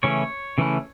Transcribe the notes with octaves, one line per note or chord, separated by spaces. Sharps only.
C#3 E3 A3 C#4 E4 C#5
C#3 E3 A3 C#4 E4